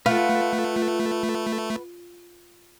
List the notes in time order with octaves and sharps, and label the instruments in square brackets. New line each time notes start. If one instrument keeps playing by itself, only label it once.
[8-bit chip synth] A3 [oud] F4 [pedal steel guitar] B4 F#5